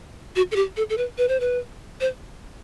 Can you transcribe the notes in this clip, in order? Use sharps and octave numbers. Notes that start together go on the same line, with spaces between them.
F#4
A4
G4
A4
A4
B4
B4
C5
B4
C5